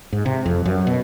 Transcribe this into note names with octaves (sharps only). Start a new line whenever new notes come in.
G#2
C3
F2
F#2
B2